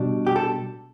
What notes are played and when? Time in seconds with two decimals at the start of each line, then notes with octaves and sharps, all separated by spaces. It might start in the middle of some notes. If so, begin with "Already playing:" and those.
Already playing: B2 G3 D4
0.27 G4
0.36 A4